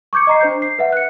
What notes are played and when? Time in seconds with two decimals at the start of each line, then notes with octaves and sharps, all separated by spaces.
0.13 C#6 D6 G6 G#6 C#7
0.27 D#5 A#5 C7
0.41 D4 C5 G6
0.62 C7
0.79 B4 E5 F#5
0.92 F#6 C#7